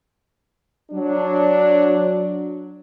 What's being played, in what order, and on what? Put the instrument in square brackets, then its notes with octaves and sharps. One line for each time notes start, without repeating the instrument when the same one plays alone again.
[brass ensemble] F#3 D4